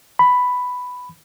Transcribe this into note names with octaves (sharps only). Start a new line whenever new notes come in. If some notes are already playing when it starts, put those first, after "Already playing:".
B5